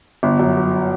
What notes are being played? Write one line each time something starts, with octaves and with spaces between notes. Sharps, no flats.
G1
F#2
F#3